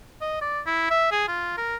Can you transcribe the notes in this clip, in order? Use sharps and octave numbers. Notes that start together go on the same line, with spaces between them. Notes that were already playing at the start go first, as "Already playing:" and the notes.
D#5
D5
E4
E5
G#4
F4
A#4